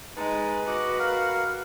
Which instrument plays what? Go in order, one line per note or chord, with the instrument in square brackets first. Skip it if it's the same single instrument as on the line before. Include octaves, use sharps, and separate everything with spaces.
[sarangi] G#3 [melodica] D#4 A5 [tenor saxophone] B4
[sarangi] F#4 [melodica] D#5 D6
[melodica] A#4 F5 F#5